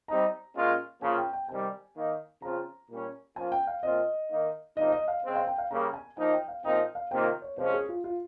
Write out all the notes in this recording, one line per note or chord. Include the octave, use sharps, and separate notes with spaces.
G3 C4 D#4 A#5
A#2 G#3 C#4 F4
C#3 F3 A#3 F4 G#5
G5
G5
C3 D#3 G3 G#5
D#3 A#3 D#4
C#3 F3 C4 F4 A#5
A#2 G3 C#4
F3 A#3 C#4 F4 G#5
G5
F5
A#2 F3 C4 F4 D#5
D#3 A#3 D#4
C3 F3 A#3 D#4 D#5
D#5
F5
C#3 G#3 C4
F5
G5
F5
C#3 G3 A#3 A#5
G#5
F3 A#3 D#4 G#5
G5
F5
A#2 F3 C4 D#4 G5
F5
C3 D#3 A#3 F4 G5
C#5
C3 F3 G#3 C#4 C5
G#4
F4
F4